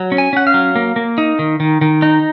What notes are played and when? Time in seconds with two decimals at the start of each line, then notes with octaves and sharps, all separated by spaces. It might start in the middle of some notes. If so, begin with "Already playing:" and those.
Already playing: F#3
0.12 C#4
0.18 G#5
0.33 C#4 F#5
0.47 F5
0.54 F#3
0.76 A#3
0.96 A#3
1.18 D#4
1.39 D#3
1.60 D#3
1.81 D#3
2.02 D#4